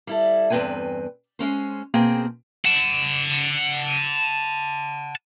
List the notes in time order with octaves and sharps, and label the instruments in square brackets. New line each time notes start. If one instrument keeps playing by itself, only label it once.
[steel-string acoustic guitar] G3 E4 A4
E2 G2 C4 B4 G5 G#5
G#3 C#4 C5
B2 A#3 C4 G#4 G5
[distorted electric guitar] F#5 A5